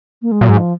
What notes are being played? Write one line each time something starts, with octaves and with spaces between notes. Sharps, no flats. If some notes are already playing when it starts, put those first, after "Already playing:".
A#3
G#3
A#2 F#3
G#2
F3